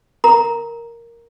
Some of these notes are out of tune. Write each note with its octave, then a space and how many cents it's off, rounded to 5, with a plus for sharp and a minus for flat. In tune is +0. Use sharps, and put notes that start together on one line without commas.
A#4 +0 A#5 +0